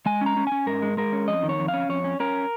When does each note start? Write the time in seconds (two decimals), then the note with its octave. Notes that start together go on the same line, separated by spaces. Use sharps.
0.06 G#3 G#5
0.21 C#4 A#5
0.37 C#4
0.47 C#4 G#5
0.67 G#2 A#4
0.82 G#3
0.97 G#3 A#4
1.13 C#4
1.28 F2 D#5
1.43 D#3
1.49 C#5
1.59 F2
1.68 F5
1.74 C#4
1.89 F2 C#5
2.04 C#4
2.20 C#4 A#4